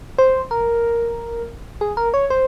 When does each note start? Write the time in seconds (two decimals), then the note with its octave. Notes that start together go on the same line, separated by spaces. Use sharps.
0.18 C5
0.51 A#4
1.81 G#4
1.97 A#4
2.14 C#5
2.30 C5